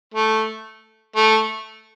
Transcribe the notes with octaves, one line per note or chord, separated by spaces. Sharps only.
A3
A3